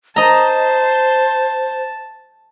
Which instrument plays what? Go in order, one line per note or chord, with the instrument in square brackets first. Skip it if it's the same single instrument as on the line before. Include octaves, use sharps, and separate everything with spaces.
[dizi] C5 [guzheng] D#5 A#5 [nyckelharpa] A5